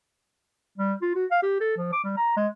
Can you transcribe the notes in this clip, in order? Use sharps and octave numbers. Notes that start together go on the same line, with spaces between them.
G3
F4
F#4
F5
G4
A4
F3
D6
G3
A#5
G#3